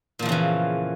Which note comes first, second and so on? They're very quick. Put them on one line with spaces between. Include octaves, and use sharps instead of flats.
A#2 F3 E2 C#3 E3